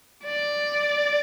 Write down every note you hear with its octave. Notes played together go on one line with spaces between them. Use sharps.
D5